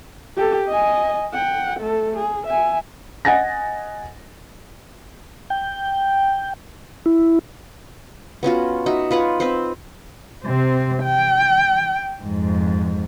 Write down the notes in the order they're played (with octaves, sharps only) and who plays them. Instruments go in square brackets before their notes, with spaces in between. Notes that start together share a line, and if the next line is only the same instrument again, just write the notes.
[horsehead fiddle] G4 A4
D#5 G#5
F#5 G5
A3 A4
G#4
E5 G#5
[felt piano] D#5 F#5 G#5 A6 A#6
[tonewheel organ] G5
E4
[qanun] B3 C#4 F4 F#4
D#4 F#4 E5
F4 B4 C#5 F#5
C4 B4 C5
[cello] C3 C4
G5
F2 G#2